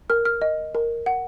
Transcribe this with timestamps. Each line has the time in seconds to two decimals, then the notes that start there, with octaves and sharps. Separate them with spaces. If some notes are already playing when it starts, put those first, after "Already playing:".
0.10 A#4 F6
0.25 F6
0.42 D#5
0.75 A#4
1.06 F#5